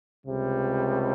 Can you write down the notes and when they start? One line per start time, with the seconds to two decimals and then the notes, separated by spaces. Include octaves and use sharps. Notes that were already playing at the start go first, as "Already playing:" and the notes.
0.25 C#2 C3 G3